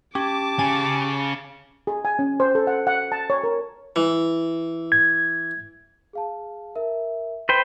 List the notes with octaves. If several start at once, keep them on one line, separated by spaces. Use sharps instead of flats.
C#4 G4 A5 D6
C#3 G#5
G#4
G#5
C#4
C5
A4
F#5
F#5
A5
C#5
A#4
E3
G#6
G#4 F5 A5
A#4 E5
B4 C5 G5 C6